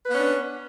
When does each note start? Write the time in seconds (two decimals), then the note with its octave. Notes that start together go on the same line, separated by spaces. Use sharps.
0.05 B4
0.09 B3
0.14 C#4
0.18 D4